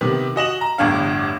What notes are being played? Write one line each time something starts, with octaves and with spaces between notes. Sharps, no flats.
C3 D#3 B3
F#4 D#5 E7 F#7
A#5
G1 E2 A2 D3 D4 F5